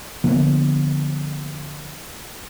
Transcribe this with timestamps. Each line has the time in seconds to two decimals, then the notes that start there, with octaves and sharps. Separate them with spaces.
0.24 D3 F3 A#3 B3